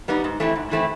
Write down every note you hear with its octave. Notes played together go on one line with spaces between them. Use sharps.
G3 B3 D#4
G#2
E3 A3 C4 E4
G#2
E3 A3 C4 E4